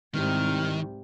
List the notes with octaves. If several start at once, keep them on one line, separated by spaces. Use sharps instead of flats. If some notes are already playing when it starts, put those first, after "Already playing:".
C2 G#2 C3 D#3 G3 F6